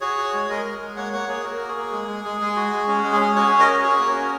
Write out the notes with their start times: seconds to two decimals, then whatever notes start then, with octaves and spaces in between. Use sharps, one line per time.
0.01 F#4 G#4 C#5
0.18 F#4
0.34 G#3
0.49 G#3 A#4 D#5
0.65 G#3
0.81 G#3
0.97 A#3 C#5 F#5
1.13 A#3 C#5 F#5
1.29 A#3 G#4 C#5
1.44 A#3 F#4 A#4
1.61 A#3
1.68 G#4
1.77 A#3
1.92 G#3
2.08 G#3
2.25 G#3
2.41 G#3
2.56 F#4
2.72 G#3
2.88 C#4 F#4
3.03 G#3
3.13 G#4
3.20 C#4
3.36 F#4 G#4 C#5
3.52 C#4
3.59 A#4 D#5
3.68 F#4
3.83 F#4 G#4 C#5
3.99 A#3
4.07 F#4 A#4
4.15 C#4